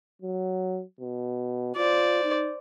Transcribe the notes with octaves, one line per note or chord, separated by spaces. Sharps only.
F#3
B2
F4 C5 D5
D#4